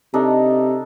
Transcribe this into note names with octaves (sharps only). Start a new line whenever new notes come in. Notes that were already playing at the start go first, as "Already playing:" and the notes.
C3 D4 D#4 A4